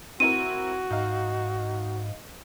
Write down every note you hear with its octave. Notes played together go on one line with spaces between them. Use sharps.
C4 E4 F#4 A#4 D#7
G#2 D#4 F5